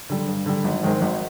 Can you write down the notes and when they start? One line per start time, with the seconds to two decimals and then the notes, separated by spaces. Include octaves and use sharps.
0.10 D3 G3
0.27 G2
0.46 D3 G3
0.64 G#1
0.83 G#2 D#3 G#3 C4
1.01 G#1